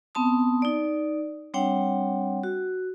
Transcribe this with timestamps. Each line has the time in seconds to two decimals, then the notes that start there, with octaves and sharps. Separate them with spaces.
0.15 B3 C4 A5 D#6
0.62 D#4 D5
1.54 G3 C4 D4 C#5 F#5 G5
2.43 F#4